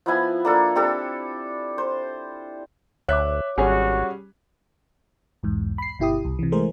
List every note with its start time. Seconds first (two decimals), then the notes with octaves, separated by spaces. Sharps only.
0.06 F3 B3 E4 G#5
0.45 A#3 D4 A4
0.75 C4 D4 G4 A4
1.78 C5
3.09 D2 C#5 E5 D6 F#6
3.58 G#1 G3 C#4 F#4 G#4
5.43 B1 E2 G#2
5.78 B5 C7
5.99 G1 B2 E4 G4 D#6
6.25 C2
6.39 C3 E3
6.52 E3 G#3 A3 G#4 A#4 C5